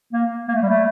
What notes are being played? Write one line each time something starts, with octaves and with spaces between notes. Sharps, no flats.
A#3
A#3
A3
G3
A3